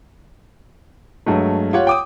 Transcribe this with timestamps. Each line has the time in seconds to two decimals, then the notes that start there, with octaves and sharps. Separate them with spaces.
1.26 G2 F#3 G#3 A3
1.73 F4 G4 C#5 F#5
1.87 G5 D6 D#6